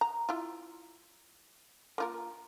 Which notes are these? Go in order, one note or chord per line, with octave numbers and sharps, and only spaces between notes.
A#5
E4 F4
A#3 F4 A#4